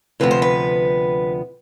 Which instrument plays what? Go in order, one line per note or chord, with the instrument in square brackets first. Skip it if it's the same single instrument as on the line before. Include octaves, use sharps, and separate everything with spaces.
[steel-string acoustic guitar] D2 C3 F3 B3 B4
C5
B4